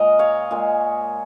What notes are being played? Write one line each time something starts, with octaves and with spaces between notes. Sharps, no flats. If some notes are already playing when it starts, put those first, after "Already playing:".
Already playing: A#2 G#3 A#4 D#5
C#5 F5
A#2 G#3